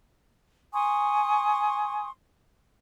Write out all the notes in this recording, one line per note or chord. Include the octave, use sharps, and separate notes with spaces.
G#5 C6 C#6 D#6